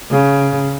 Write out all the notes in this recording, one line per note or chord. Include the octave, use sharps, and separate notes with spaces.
C#3